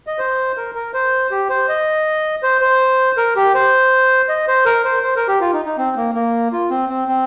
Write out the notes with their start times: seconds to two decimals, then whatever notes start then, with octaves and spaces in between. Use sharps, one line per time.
0.07 D#5
0.19 C5
0.57 A#4
0.75 A#4
0.94 C5
1.31 G4
1.49 C5
1.69 D#5
2.43 C5
2.61 C5
3.17 A#4
3.36 G4
3.55 C5
4.29 D#5
4.47 C5
4.65 A#4
4.85 C5
5.03 C5
5.16 A#4
5.28 G4
5.40 F4
5.53 D#4
5.65 D#4
5.78 C4
5.97 A#3
6.15 A#3
6.53 F4
6.70 C4
6.89 C4
7.08 C4